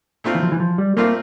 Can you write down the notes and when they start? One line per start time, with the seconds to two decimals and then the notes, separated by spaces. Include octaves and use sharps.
0.24 A#2 A3 C4 F4
0.35 E3
0.43 F3
0.52 E3
0.60 F3
0.78 G3
0.97 A#2 A3 A#3 C4 F4